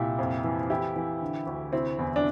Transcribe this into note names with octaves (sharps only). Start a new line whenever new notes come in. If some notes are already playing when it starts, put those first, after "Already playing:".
Already playing: C2 A#2 E4 G4
F2
E3
E3 E4 G4
E3
D3
D2
C3 C4 E4
E2
D4